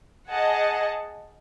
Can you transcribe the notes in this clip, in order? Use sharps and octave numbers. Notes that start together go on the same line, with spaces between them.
G#4 D#5 F#5 A5